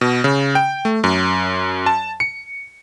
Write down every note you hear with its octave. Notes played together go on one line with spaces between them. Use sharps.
B2
C#3
G5
A3
F#2
A5
C#7